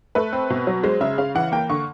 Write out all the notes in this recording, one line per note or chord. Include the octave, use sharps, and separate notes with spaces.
A3 B4
C4
B2
F#3
G#3 C5
C#3 E5
C#3 F5
E3 F#5
A#3 G5
D3 C#6